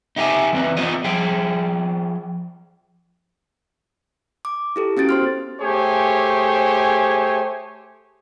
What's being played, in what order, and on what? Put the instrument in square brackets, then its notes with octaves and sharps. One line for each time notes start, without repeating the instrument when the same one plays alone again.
[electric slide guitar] D#4 E4 G4 A#4 E5 G#5
E3 C4 B4
B3 F4 C#5 D#5
F3 G#4 G5
[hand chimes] D6
E4 G4 A4
B3 C#4 F#4 A6 D7
C5 C6 F6
[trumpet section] A3 G4 G#4 C5 C#5 G#5